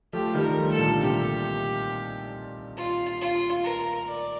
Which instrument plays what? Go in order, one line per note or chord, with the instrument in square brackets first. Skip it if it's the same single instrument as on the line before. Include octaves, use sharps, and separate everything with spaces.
[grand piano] F3 A3 [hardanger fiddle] G4
[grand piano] D#3 G3
[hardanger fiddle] A#4
[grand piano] F3 A3
[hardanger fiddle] A4
[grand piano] A#2 D3
[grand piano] C3 [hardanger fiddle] G4
[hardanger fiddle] F4
F4
A#4
D5